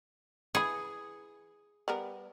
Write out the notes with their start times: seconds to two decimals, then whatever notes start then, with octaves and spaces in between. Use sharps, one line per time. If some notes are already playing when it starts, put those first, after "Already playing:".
0.55 E3 G#4 B5
1.88 G3 B3 A#4